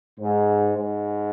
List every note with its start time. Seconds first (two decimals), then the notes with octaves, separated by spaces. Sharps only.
0.20 G#2
0.76 G#2